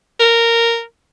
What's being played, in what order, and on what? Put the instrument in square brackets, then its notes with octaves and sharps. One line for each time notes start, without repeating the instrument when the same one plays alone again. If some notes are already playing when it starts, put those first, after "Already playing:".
[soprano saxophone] A#4